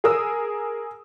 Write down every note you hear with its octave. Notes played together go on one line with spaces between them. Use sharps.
G#4 A#4 D#6 E6